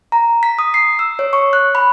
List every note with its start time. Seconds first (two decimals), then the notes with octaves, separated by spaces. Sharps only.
0.12 A#5
0.43 B6
0.59 D#6
0.74 C7
0.99 E6
1.19 C#5
1.33 C#6
1.53 F#6
1.75 B5